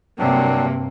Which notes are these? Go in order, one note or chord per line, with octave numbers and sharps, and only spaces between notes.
G2 C3 F#3 A#3 C4 D4